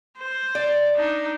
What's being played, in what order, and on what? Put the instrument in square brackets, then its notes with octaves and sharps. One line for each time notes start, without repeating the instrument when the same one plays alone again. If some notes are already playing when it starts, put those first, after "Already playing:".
[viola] C5
[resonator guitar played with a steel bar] D5
[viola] D4 D#4